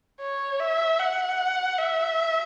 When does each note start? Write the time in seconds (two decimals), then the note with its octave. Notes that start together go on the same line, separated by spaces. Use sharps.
0.21 C#5
0.60 E5
0.99 F#5
1.78 E5